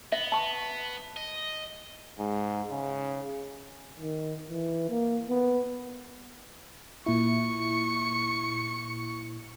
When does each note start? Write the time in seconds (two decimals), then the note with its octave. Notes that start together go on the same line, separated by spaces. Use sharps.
0.12 B3 E5
0.32 A5 C#6
1.17 D#5
2.19 G#2
2.71 C#3
4.00 D#3
4.50 E3
4.90 A#3
5.29 B3
7.06 A#2 E4 C#6 C#7